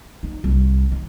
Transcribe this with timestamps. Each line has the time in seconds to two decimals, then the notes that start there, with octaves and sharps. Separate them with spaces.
0.23 D#4
0.44 C2
0.92 D#3